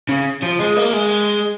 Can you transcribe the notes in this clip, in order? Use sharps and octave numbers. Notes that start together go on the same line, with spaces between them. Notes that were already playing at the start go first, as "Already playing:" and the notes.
C#3
F3
G#3
A#3
G#3